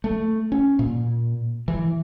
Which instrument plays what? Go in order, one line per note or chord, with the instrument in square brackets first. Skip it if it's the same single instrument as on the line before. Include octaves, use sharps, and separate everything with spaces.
[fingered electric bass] A3
C#4
A#2
E3